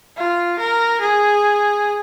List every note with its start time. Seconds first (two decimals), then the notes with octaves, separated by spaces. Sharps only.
0.17 F4
0.59 A#4
1.01 G#4